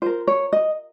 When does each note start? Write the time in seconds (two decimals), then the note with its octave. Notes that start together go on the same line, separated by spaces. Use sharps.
0.02 F4 A#4 C5
0.27 C#5
0.53 D#5